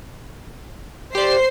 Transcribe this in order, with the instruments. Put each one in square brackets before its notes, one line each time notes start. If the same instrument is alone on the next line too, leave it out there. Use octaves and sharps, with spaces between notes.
[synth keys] G4 D5 [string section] C5 C7